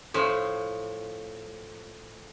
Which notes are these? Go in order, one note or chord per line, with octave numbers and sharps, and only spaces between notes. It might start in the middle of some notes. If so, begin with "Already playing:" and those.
A2 F3